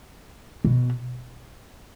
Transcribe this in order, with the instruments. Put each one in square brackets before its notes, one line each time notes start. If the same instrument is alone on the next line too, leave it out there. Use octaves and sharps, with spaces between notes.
[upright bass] B2